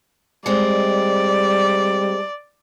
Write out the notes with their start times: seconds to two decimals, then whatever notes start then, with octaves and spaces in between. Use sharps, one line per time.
0.46 G3 G#3 C4 D5